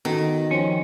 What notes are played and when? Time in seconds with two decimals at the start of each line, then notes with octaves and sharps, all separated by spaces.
0.05 D#3 B3 F#4 A4
0.51 F3 C#4 C5